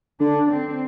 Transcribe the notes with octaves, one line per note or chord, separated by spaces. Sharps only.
D3 D4
C4